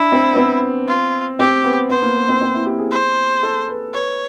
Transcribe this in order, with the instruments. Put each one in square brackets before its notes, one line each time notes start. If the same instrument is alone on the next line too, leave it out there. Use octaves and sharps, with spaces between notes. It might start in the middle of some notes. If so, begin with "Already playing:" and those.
Already playing: [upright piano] D4 [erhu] E4
[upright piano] C4
B3
C4
[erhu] F4
[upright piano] C4 [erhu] G4
[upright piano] B3
[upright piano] B3 [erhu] C5
[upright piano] A#3
B3
C4
C4
E4
G4
G#4
[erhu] C5
[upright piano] A4
B4
[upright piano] B4 [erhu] C#5